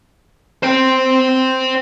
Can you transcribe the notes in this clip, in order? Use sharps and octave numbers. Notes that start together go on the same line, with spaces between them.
C5 G5